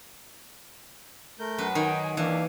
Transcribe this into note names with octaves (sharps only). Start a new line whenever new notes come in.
A3 A#4 G6
F#2 B4
D#3 G5 G#5
G#5
G2 E3 A#3 D4 F5